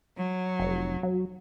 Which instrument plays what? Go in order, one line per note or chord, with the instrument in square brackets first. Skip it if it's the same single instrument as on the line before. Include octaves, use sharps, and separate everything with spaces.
[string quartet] F#3
[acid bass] F1
F#3